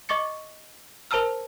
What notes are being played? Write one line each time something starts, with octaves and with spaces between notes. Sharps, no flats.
D#5 C#6 D6 A6 C#7
A#4 C5 A5 A#5 E6 F6